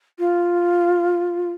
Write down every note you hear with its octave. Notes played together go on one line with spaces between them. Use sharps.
F4